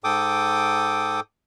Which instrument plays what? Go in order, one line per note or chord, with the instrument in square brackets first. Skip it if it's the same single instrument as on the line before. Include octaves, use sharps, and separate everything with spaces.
[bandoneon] G#2 A4 G5 D6 D#6